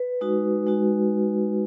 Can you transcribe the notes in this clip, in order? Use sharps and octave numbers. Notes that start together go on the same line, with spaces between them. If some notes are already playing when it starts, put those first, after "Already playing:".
Already playing: B4
G#3 D#4 F#4
G#3 D#4 F#4